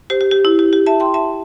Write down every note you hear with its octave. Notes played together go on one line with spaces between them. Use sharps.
G4 C5
G4
G4
E4
G4
G4
E5 A5
G5 C6
E5 A5